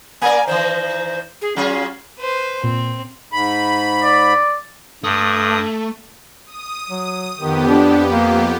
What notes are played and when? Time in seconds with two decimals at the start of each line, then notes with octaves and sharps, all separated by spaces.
0.22 A#3 A#4 D5 G#5
0.47 D#3 E3 C5
1.41 G#4
1.56 F#3 C#4 F4 G#4
2.19 B4 C5
2.63 A#2 C4
3.33 G#2 B5
4.02 D5
5.04 G2 A3 D#6
6.46 D#6
6.90 F#3
7.37 F2 D#3 B3 G4
7.68 D4
8.11 A#3